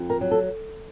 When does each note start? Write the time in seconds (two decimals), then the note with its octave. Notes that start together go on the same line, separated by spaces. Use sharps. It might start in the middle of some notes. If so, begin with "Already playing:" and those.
Already playing: F2
0.10 A#4
0.21 F#3
0.31 A4